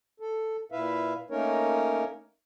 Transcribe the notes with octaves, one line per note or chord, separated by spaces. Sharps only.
A4
A#2 E4 B4 E5 F5
A3 A#3 C#4 D#4 A#4 C#5